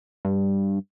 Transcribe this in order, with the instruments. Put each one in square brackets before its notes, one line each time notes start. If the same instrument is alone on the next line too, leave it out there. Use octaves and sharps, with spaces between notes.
[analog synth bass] G2